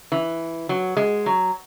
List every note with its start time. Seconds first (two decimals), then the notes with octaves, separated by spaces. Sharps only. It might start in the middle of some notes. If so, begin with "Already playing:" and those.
0.12 E3
0.69 F#3
0.97 G#3
1.26 F#3